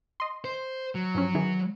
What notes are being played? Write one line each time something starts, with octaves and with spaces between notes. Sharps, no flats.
D#5 C6
C5
F#3
G2 F3 C#4
D#3 E3 G#4